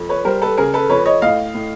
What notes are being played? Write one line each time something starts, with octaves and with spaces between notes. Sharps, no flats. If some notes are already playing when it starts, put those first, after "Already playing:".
Already playing: F2
B4 C#5
G3 A#4 C5
A4 B4
C#3 G#4 A#4
A4 B4
F2 B4 C#5
C#5 D#5
A2 D#5 F5
A2